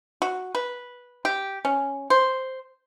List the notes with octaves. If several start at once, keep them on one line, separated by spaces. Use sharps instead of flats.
F#4
B4
G4
C#4
C5